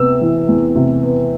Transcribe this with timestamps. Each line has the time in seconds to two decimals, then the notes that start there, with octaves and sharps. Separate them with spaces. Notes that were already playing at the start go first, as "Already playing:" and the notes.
Already playing: C3 B3 E6
0.21 E3
0.48 E2
0.76 C3
1.03 B3